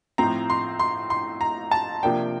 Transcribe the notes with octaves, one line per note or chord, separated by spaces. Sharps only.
A2 F3 C4 A#5
C6
C6
C6
A#5
A5
C3 F3 A#3 D4 G5